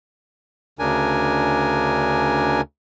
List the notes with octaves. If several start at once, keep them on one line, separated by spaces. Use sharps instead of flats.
D2 C#3 D4 A#4 G#5